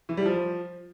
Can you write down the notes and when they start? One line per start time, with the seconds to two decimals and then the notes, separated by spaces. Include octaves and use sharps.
0.09 E3
0.17 G3
0.26 F3